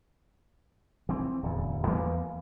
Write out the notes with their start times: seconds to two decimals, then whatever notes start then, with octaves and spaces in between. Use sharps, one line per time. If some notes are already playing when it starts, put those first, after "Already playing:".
1.09 E3 C4
1.43 D1 E2
1.87 E2 E3 A#3 B3